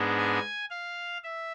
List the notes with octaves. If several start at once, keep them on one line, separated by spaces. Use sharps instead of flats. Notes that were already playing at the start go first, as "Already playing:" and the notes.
Already playing: G#2 G#3 B3 D4
G#5
F5
E5